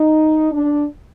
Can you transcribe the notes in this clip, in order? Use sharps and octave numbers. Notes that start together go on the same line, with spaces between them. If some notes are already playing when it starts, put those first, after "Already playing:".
Already playing: D#4
D4